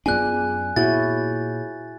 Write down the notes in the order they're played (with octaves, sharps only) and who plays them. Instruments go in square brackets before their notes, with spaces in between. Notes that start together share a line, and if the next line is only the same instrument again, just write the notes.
[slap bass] F#2 B3 D4 [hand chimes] F4 G#4 D5 [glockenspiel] G#5 F#6
[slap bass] A#2 B3 [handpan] E4 F#4 [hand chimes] G#4 C#5 G6 [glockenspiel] A6